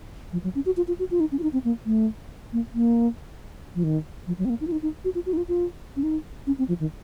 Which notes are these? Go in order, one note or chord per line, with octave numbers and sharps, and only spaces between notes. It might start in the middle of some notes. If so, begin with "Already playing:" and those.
F3
F#3
C#4
F#4
F4
F4
F#4
F4
D#4
C#4
F4
D#4
C4
A#3
A3
A#3
A#3
F3
D#3
F3
F#3
C4
A#3
D#4
F4
D#4
D#4
F#4
F4
F#4
D#4
F4
F4
C#4
D#4
C#4
C4
F3
D#3